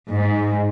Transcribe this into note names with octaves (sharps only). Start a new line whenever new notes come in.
G#2